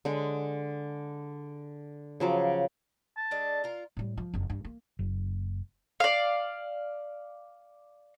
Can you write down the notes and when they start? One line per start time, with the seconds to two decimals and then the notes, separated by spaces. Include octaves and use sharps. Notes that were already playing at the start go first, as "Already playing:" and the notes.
0.05 D3 G#3
2.20 C#3 F3 F#3 D6
3.17 A5
3.31 G#3 D4 A4
3.64 F4 A#4
3.97 A2 G3
4.17 F3
4.34 F#1 F2
4.50 G2
4.65 A#3
4.99 F#1
6.00 D5 F5